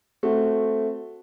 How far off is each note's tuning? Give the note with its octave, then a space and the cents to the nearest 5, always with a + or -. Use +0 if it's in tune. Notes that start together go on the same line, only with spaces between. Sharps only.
A3 +0 C4 +0 F#4 -10